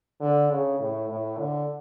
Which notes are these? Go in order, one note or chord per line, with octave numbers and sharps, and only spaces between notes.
D3
C#3
A2
A2
D3